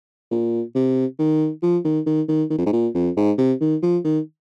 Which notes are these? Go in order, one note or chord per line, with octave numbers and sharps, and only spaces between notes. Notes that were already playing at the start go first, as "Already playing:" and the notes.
A#2
C3
D#3
F3
D#3
D#3
D#3
D#3
F2
G#2
A#2
F2
G#2
C3
D#3
F3
D#3